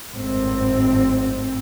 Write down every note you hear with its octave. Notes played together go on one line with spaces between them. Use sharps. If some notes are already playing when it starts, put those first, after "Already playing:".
G#1 F#2 A2 C4